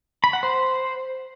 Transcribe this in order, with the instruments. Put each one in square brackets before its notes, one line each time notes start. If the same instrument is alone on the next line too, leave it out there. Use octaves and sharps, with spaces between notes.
[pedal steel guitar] B5
F#5
C5